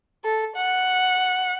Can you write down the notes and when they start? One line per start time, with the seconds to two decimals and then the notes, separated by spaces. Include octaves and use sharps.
0.24 A4
0.56 F#5